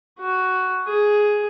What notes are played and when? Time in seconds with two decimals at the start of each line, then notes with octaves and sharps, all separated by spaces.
0.19 F#4
0.87 G#4